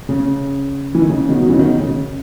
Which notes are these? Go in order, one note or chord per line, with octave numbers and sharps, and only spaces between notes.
C#3
E3
D#3
C#3
B2 D#3
F#3
C#3 E3
B2 D#3
C#3